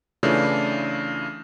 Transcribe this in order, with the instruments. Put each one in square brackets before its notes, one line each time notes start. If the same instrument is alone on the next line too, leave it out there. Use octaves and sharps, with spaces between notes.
[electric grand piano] C#3 E3 A3 D4 E4 F4